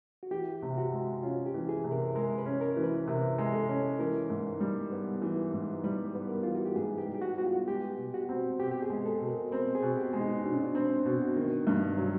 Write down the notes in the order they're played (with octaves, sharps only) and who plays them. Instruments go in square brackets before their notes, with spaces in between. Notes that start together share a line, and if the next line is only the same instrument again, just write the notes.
[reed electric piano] F#4
[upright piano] E3 [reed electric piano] G4
[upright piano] C3
[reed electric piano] F#4
[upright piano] G#3
[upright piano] C#4 [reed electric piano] F4
[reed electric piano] G4
[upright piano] E3
[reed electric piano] G#4
[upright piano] C3
[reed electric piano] A#4
[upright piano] G#3 [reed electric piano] A#4
[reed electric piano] B4
[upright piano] C#4
[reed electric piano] A#4
[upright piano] E3
[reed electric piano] B4
[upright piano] C3 [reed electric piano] A#4
[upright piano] G#3
[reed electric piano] A4
[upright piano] C#4
[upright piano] E3 [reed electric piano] A#4
[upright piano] G#2
G3
B3
E3
G#2
[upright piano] G3 [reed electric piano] B4
[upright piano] B3
[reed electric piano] A#4
[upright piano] E3 [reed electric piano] F4
[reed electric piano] F#4
G4
[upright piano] G#2 [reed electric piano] G#4
[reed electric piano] G4
[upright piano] G3
[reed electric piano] G4
F#4
[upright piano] B3 [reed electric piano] F#4
[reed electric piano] F4
[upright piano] G#3 [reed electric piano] G4
[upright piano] B2
[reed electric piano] F#4
[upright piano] C4
[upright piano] B2 [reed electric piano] G4
[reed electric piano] G4
G#4
[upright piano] G#3
[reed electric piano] A4
[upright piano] B2
[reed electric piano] A#4
[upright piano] C4 [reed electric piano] A#4
[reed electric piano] G#4
[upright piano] B2
[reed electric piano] G4
[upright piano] G#3
[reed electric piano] D#4
[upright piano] B2 [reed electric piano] D4
[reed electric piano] C#4
D4
[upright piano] C4
B2
D#3
G2
F#3